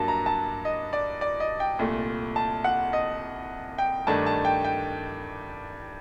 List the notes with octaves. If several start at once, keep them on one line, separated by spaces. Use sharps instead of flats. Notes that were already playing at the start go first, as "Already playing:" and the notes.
Already playing: G2 F#3 A#3 D4 A5
A#5
A5
D#5
D5
D5
D#5
G5
C2 A#2 A3
A5
F#5
D#5
G5
G2 D#3 A3 D4 A5
A5
G5
G5